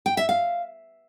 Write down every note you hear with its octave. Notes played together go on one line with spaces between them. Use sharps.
G5
E5
F5